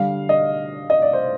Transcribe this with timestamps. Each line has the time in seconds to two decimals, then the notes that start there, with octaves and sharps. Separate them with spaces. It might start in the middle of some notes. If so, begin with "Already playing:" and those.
Already playing: D3 G3 D4 F5
0.29 D#5
0.90 D#5
1.02 D5
1.13 C5